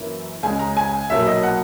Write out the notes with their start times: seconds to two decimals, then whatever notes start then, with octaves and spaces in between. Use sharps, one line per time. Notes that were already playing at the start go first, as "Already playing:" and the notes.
Already playing: F#2 E3 A#3
0.43 C#2 C#3 G#3 G#5
0.59 A#5
0.77 G#5
1.10 B1 A#2 F#3 E5
1.27 D#5
1.43 F#5